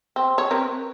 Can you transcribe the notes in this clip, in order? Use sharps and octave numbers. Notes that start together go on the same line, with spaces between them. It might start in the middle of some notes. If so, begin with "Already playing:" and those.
C4
C#5
C4 A#4 B4